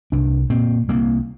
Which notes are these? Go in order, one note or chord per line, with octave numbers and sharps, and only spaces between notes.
C2 D4
A#2 C4
C2 A#3